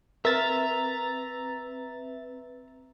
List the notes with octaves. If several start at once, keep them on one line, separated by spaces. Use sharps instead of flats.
C4 A#4 B4 E5 A#5 A6